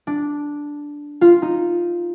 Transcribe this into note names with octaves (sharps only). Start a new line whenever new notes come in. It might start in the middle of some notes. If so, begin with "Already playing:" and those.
D4
F4
D#4